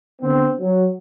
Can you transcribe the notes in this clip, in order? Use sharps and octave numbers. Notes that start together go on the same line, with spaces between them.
D3 B3 C4
F#3